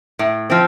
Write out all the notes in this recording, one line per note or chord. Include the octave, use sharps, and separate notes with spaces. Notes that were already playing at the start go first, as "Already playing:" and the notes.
A2
F3 C4